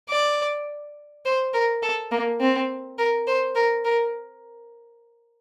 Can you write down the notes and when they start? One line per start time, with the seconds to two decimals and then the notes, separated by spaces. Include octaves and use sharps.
0.09 D5
1.25 C5
1.54 A#4
1.82 A4
2.11 A#3
2.40 C4
2.98 A#4
3.27 C5
3.56 A#4
3.85 A#4